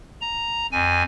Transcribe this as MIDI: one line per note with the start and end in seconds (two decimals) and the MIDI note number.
0.21 0.66 82
0.72 1.03 41
0.72 1.03 80